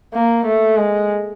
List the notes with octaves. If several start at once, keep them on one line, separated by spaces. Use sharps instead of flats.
A#3
A3
G#3